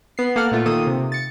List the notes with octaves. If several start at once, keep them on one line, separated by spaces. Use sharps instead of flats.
B3 C7
A#3 A4 F5 F#5 F6
A#2 A3 F4
D#3 A#3 F4 A4 D#6 E6
C3
A6 C#7